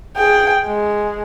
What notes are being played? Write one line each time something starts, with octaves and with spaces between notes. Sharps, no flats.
G#4 G5
G#3